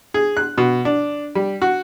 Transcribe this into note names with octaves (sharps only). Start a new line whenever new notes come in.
G#4
F#6
B2
D4
G3
F#4